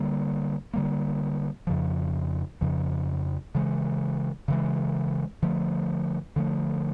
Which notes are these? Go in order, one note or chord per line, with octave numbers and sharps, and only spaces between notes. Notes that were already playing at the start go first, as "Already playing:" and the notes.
Already playing: D3 G3 A#3
D3 G3 A#3
F2 C#3 F3
F2 C#3 F3
C#3 E3 G#3
C#3 E3 G#3
D3 F3 A3
D3 F3 A3